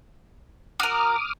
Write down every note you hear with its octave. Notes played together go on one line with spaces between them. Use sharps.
F#4 A#4 D6 D#6 F6